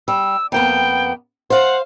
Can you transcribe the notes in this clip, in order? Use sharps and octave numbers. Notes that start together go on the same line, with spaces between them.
G3 E6
F2 A#3 B3 G5
C5 F5 F#5